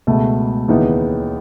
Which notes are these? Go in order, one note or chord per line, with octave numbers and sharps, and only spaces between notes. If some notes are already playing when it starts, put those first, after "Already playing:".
C#2 B2 A3
D#2 C#3 E3 B3 D#4